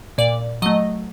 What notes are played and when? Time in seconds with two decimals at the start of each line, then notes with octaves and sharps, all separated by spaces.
0.18 A#2 D5
0.62 F#3 A3 D#5